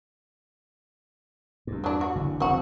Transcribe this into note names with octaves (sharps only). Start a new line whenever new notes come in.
E2 G2
F#3 D4
F#4
F#1 D3 E3
F1 E2 C4 F#4